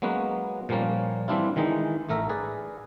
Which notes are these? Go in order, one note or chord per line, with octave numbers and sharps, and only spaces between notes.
F#3 G#3 A#3 B3 C#4 B4
A#2 F3 G3 A#3 C#4
E3 G3 C4 D4 E4 F4
D#3 E3 G#3 D#4
A1 A3 A#4 E5 A#5
G#4 B4 D5